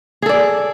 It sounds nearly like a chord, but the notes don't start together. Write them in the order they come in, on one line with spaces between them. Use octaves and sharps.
G#4 A4 D5